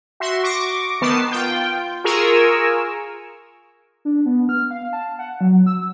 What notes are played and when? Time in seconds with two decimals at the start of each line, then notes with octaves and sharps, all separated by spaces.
0.20 F#4 E5 C6
0.43 C#6 D6 A#6
1.01 D#3 B3 A5 C7
1.32 F4 G5
2.04 F4 G#4 A#4 G#5 C#6 E6
4.05 D4
4.26 B3
4.49 F6
4.71 F5
4.93 A5
5.19 F#5
5.41 F#3
5.66 E6